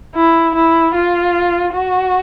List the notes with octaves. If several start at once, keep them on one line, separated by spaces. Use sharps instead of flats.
E4
E4
F4
F#4